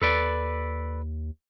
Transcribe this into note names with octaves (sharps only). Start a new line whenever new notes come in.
D#2 A4 B4 D5